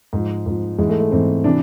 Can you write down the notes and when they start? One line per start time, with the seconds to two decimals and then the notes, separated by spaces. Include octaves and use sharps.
0.13 G#2 F3
0.46 G#2 F3
0.78 G#2 E3 G#3
0.89 A3
1.00 A3
1.11 G#2 E3 C4
1.44 C3 E3 D4